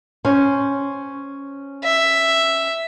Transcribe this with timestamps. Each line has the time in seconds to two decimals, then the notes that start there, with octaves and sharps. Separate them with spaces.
0.25 C#4 C5 C#5
1.84 E5